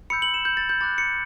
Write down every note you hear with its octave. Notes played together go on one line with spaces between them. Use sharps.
B5 E6 G6 C#7
F#7
E7
G6
A6
G6
B5 D6 F#6 A6
C#7